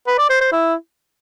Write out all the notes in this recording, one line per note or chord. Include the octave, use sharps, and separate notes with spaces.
B4
D5
C5
C5
E4